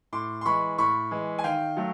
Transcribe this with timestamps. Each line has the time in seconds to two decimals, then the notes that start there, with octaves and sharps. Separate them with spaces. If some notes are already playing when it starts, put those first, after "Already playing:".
0.13 A2 C6 D6
0.41 C6
0.46 E3 G#3 B5 C#6
0.78 A2 B5 C#6
1.11 E3 G#3
1.39 G#5
1.44 D#3 F5 G5
1.77 F#3 A3